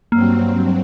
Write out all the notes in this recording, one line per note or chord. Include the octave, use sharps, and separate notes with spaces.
G2 F#3 A#3 C4